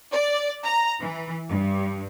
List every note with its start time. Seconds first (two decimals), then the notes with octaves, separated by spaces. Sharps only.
0.12 D5
0.64 A#5
1.01 E3
1.48 G2